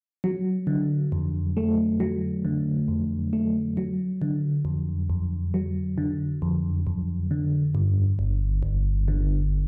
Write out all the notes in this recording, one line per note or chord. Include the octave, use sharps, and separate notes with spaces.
F#3
D3
F2
A3
F#3
D3
F2
A3
F#3
D3
F2
F2
F#3
D3
F2
F2
D3
G2
G1
G1
D3